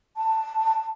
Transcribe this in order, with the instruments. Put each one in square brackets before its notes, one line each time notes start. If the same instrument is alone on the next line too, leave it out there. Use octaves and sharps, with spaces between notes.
[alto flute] A5